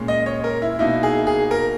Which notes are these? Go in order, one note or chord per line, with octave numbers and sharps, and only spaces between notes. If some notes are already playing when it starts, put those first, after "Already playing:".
Already playing: A#2 G#3 C#4
D#5
C#5
A#4
E4
B2 A#3 D#4 E4
G#4
G#4
A#4